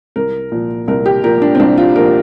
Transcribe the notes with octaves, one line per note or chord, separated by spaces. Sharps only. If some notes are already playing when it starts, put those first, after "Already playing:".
C2 A#4
A#2 F3
C2 A#4
G4
A#2 F3 A#4
D4
C4
C2 D4
F4
A#2 F3 A#4